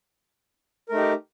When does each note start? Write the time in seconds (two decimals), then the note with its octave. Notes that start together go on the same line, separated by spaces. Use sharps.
0.89 A#4
0.92 A3
0.95 D#4
0.97 G4